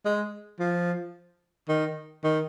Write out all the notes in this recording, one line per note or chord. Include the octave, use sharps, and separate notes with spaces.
G#3
F3
D#3
D#3